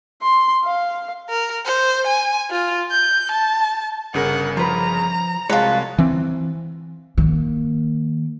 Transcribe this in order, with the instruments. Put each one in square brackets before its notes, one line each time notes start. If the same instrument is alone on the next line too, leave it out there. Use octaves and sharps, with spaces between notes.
[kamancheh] C6
F5
[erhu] A#4
C5
G#5
F4
G6
A5
[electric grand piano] G1 C#3 A#4 [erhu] F#5
[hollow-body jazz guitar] F3 B4 [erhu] A#5
[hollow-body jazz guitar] C2 F#4 C#5 [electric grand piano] G#3 A5 [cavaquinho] F4 B4
[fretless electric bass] E3 C4
[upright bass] D#3 A#3